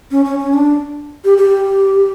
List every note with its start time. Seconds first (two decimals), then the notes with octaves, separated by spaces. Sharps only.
0.11 C#4
0.25 C#4
0.39 C#4
0.53 D4
1.24 G4
1.38 G4